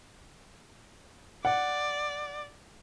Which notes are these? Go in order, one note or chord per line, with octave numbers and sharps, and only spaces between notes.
D5 F#5